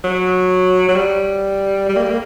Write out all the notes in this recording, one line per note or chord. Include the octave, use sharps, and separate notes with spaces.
F#3
F#3
G3
G3
A#3
G3
A#3